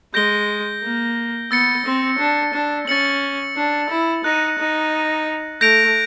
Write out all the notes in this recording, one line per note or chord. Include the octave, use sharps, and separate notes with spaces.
G#3 G6 A#6 D7 G7
A#3
B3 E6 A6 C#7
C4
D4
D4
C#4 A6 C#7 F#7
D4
E4
D#4 F#6 A#6 D#7
D#4
A3 G6 A#6 D7 F7